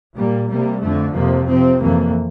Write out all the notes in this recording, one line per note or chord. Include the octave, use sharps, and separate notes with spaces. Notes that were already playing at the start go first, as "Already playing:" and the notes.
A#2 G3 A#3
C3 G3 A#3
F2 D3 A3
F2 C3 F3 A#3
C3 F3 C4
F2 E3 A#3